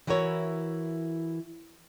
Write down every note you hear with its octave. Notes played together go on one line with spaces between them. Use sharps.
E3 E4 F#4 A#4 C#5